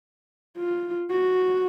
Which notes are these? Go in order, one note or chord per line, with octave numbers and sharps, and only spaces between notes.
F4
F#4